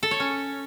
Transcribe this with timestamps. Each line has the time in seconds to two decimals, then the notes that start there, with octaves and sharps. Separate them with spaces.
0.03 A4
0.11 C#5
0.20 C#4